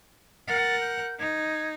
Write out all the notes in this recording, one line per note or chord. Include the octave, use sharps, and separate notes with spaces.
A#4 F#5 A6
G6
D#4 G#6